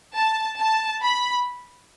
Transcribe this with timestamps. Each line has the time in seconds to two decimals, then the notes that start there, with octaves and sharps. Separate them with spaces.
0.15 A5
0.59 A5
1.03 B5